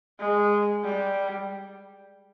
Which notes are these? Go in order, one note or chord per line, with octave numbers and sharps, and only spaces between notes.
G#3
G3